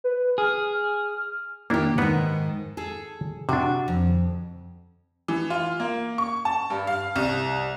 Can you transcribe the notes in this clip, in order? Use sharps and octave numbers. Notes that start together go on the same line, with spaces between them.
B4
G#4 F6
D#3 A#3 D4 E4 G4
G#2 D#3 B3 B4 F#5
G#4 A4
C3 D4 F#4
F2
E3
F4
A#3
C#6
A5
G2
F5
C2